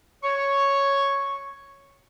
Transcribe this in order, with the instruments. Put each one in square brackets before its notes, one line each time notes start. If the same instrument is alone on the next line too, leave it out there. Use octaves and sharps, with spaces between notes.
[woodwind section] C#5 C#6